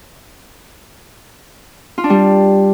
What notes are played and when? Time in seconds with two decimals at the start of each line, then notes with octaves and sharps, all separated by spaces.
1.98 F4
2.04 D4
2.10 G3